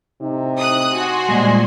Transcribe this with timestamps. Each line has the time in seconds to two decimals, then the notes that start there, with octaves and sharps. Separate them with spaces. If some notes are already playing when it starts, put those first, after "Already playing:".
0.20 A2 C3 D#4
0.59 D#6 F#6
0.94 F#4 G#5 C6
1.29 A#2 F3 G3 G#3